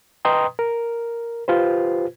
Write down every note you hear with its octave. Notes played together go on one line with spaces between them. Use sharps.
B4 D#5 G5 A#5 C6 D#6
A#4
F4 G4 B4 C5